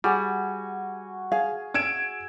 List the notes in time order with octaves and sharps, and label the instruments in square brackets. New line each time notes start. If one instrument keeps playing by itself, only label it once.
[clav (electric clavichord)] G3 [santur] F#4 G#5 [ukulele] G#4
[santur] G#4 [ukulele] F5
[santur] E5 [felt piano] G#6 D7 E7